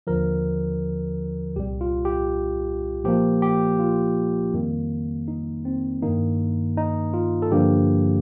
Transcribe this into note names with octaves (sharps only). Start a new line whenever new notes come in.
D#2 D3 F3 A#4
C2 A#2 G3 G4
F4
G4
A#2 F3 A#3 G4
G4
F4
F2 D#3 G3 A#3
D#4
C4
G2 D#3 A#3 D#4
D#4
F4
A4
G2 D3 F3 A#3 G4